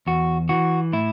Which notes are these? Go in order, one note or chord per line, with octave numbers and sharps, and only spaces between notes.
E2 F#4
E3 F#4
A2 E4